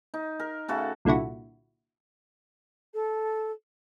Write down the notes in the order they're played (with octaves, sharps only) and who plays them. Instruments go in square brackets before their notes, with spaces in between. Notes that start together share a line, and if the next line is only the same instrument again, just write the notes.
[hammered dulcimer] D#4
A#4
C#3 A3 F#4 A4
[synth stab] C2 A#2 D3 E4 F#4
[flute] A4